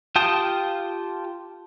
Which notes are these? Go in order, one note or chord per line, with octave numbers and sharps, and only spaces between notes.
F4 G4 G5 A5 D#6